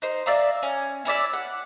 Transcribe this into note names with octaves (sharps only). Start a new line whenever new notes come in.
D#4 C5
D5 E5 F5 A#5
C#4
C#4 E4 D5 E5
F#5